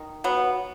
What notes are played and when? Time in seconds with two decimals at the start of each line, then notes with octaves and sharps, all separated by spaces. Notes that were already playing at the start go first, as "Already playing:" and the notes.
Already playing: D#3
0.24 F#3 B3